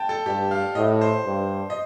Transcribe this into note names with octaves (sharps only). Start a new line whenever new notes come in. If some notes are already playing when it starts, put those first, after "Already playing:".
Already playing: G5 A5
A4
G2 G4
F5
A2 D#5
C5
G2
D#5